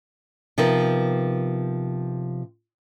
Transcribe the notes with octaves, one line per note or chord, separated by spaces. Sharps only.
C3 F3 B3 D#4 A#4